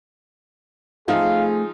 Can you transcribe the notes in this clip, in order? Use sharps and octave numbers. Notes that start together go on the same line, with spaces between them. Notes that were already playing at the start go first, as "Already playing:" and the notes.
F3 A3 C4 D#4 F4 G#4 F5